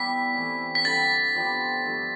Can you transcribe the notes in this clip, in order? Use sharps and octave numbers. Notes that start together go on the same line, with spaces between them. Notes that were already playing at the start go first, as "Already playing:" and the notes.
Already playing: G3 B3 E4 G4 B6
C3 E3 A3
B6
D3 G3 D4 A6
F3 B3 D4 G4
G2 F3 A3